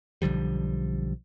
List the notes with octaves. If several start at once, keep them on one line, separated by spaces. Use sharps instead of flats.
B1 D3 F3 G3